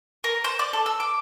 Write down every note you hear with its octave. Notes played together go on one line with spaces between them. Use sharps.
A#4
C5
D5
A4
E6
D6